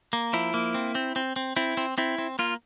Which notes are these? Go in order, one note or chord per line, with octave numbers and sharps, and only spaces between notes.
A#3
F3 E4
A#3
C4
C4
C4
C4
C4 E4
C4
C4 E4
C4
A#3 F4